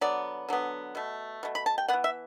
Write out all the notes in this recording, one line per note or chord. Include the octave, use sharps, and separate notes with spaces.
D3 F#3 B3 D5
D3 F#3 B3
B2 A3
B2 A3
B5
A5
G5
E3 B3 F#5
E5